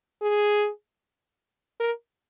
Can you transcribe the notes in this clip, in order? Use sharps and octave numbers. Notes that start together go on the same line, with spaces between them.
G#4
A#4